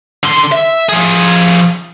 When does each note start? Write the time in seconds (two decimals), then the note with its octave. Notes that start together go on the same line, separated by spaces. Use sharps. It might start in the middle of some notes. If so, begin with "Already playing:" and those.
0.23 D3 C6
0.52 E5
0.89 F3 G#4